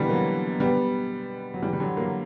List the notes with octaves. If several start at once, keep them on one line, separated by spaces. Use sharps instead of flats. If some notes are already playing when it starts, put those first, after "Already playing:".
Already playing: B2 D3 E3 G3
F#3 A#3
G3 B3
F#3
E3 G3
G3
D3 F#3
F#3 A#3